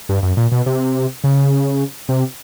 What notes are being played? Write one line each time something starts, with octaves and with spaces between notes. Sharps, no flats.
G2
F#2
A#2
B2
C3
C#3
C3